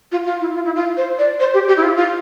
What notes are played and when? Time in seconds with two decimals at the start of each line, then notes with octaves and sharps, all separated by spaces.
0.12 F4
0.26 F4
0.41 E4
0.55 F4
0.65 E4
0.76 F4
0.97 C5
1.19 D5
1.40 C5
1.54 G4
1.68 G4
1.77 E4
1.83 F4
1.96 F4